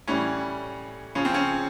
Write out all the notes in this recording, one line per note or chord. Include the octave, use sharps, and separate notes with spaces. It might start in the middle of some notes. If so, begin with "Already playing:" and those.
A2 E3 G3 C#4
C#3 F3 C#4
C4
C#4